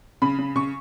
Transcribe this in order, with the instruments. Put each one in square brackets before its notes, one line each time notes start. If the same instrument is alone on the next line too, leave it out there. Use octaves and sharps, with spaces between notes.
[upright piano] C#3 B5
C#3
C#3 C#6